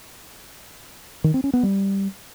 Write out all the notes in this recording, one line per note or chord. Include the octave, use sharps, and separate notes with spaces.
D#3
C4
C#4
B3
G3